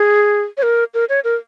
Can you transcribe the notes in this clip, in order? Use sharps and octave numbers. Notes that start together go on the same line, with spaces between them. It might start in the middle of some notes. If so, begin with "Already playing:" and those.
Already playing: G#4
C#5
A#4
A#4
C#5
A#4